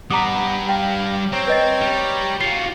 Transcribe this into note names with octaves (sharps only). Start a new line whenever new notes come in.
G3 B3 B4 F#5 A#5 D6 D#6
F5 G5
C4 C#5 G5 A#5
B4 D#5 A6
G3
F4 F#4 C7